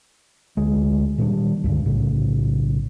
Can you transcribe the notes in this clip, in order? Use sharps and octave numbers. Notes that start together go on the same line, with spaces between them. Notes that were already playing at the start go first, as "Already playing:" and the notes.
D2 G#3
A#2 D#3 G3 D4
C#2 G2 D3
B1 A2 C#3